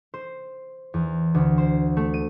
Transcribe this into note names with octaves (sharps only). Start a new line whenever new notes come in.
C5
E2
D2
C5
A3
D#7